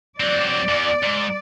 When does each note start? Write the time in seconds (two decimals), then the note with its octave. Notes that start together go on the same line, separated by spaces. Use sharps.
0.20 F#3 C4 D5
0.69 E2
1.03 G#2